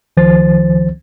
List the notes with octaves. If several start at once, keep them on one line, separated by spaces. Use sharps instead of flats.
C#2 D#3 F3 C5 A6